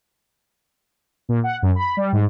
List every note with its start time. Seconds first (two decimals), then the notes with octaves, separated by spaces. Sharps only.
1.29 A#2
1.44 F#5
1.62 F#2
1.75 B5
1.97 G3
2.13 G#2